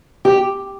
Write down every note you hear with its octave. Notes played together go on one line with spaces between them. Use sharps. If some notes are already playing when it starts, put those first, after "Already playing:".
G4